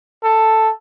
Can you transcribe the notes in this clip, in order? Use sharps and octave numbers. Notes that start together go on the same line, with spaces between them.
A4